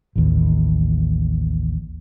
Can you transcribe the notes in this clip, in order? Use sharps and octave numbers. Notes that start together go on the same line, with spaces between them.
A1 D#2